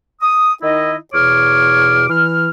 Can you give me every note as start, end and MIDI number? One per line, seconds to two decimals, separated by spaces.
0.21 0.51 87
0.62 0.94 51
0.62 0.94 63
0.62 0.94 64
0.62 0.94 75
1.13 2.05 40
1.13 2.05 47
1.13 2.05 73
1.13 2.05 86
1.13 2.05 89
2.09 2.49 52
2.09 2.49 89